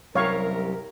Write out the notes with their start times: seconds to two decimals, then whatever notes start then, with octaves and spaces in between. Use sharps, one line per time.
0.15 C2 F#2 G4 A#4 C#5 F5 C#6